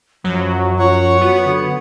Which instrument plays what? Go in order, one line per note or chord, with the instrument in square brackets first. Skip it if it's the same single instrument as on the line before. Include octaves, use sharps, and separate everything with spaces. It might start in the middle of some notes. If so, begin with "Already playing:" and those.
[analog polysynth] F#2 F#3 [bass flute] F3
[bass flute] F4 [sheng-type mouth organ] C#5 F#5 C#6
[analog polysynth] B3 [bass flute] F#4
[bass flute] D3